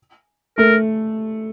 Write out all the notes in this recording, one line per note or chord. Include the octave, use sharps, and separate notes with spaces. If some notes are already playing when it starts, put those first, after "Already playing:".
A3 A#4